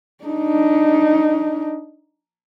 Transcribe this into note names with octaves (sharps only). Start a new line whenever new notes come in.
D4 D#4